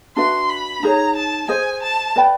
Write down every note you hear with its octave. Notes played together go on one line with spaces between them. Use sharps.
D4 F#4 B4 E5 C6
B5
D#4 G#4 C#5 A#5
A5
G#4 C5 D#5 G#5
A5
B4 D5 G5 B5